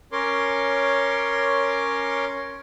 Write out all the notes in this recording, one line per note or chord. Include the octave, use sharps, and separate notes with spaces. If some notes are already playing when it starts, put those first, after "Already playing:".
C#4 A#4 C#5 C6 D6